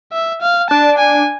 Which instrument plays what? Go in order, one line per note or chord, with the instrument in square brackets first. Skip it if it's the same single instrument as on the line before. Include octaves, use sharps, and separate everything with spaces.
[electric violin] E5
F5
[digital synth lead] D4 [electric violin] A5
[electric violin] G#5